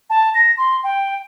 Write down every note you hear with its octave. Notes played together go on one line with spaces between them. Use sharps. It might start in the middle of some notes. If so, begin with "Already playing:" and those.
A5
A#6
C6
G5